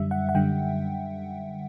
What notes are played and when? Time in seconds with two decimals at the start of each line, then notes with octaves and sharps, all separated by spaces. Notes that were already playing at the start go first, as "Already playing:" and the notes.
Already playing: F#2 D3 G3 E5
0.11 F#5
0.29 F#5
0.35 F#2 D3 G3 G5